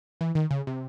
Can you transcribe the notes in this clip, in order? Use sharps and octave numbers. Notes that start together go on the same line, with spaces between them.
E3
D#3
C#3
C3